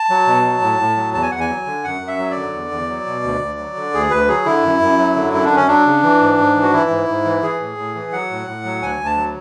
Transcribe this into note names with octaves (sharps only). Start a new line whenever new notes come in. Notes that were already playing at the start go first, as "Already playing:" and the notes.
Already playing: A5
F#3
B2
F#3
A2
A2
F#3
E2 A5
G#5
E2 F#5
G#5
F#3
D3
F#2 F#5
F#2
E5
F#3
D5
D3
E2
E2
F#3
B2
D2
D2
F#3
D3
D2 G#4
D2 B4
F#3 G#4
D3 E4
F#2
F#2
F#3
D3
F#2 E4
D4
F#2
C#4
F#3 D4
C#3
E3
G#2
G#2
E3
F#4
E3 E4
G#2
G#2
E3
E3 G#4
A2
A2
E3
F#3 F#5
A2
A2
F#3
D2 G#5
D2
A5
F#3